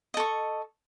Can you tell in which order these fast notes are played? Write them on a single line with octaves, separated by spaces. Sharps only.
D#5 A4 C#6